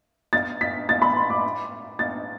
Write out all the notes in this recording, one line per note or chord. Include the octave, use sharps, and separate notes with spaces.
A6
B6
A6
B5
C6
D6
A6